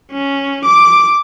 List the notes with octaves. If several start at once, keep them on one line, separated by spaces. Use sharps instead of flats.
C#4
D6